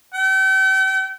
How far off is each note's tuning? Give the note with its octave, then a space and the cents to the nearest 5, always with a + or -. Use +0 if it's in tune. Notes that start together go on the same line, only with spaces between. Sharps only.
G5 -40